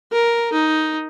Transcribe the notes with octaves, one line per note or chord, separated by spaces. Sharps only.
A#4
D#4